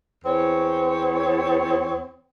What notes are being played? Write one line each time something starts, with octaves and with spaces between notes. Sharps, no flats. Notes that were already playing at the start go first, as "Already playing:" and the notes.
E2 C4 C#5